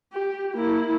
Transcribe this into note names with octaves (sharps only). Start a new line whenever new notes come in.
G4
A#3 E4